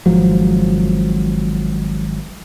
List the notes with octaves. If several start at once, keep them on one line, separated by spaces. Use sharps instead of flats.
G#1 G#2 F3 F#3